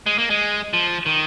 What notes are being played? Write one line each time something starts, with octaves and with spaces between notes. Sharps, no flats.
G#3
A#3
G#3
F3
D#3